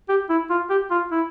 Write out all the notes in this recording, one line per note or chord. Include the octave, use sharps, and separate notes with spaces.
G4
E4
F4
G4
F4
E4